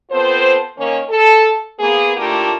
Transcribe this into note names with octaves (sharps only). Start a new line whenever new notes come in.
B3 C4 F4 A4 C5
D#3 A#3 C#4
A4
A#3 B3 G#4
A2 A3 A#3 D4 F4 G4